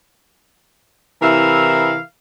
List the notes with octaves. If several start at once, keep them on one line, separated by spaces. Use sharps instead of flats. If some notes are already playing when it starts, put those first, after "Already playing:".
C3 E3 E4 A#4 E5 F5